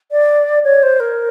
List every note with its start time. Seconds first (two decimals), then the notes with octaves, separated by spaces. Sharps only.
0.11 D5
0.64 C#5
0.82 C5
1.00 A#4